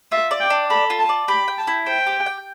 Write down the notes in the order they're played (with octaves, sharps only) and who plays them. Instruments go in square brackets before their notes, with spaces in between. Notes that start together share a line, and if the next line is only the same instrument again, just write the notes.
[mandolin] F4 [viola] E5
[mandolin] D5
[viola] G5
[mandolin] D4
[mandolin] A4 [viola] B5
[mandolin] F4
[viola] A5
[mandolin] D5
[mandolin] G4 [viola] B5
[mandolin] G5
[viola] A5
[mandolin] E4
[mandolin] C5 [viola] G5
[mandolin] G4
G5